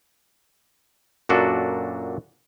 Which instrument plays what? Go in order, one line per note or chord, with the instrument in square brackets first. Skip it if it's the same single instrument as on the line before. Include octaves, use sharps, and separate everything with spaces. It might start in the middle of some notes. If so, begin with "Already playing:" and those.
[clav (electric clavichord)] F#2 A#2 D4 F#4 A4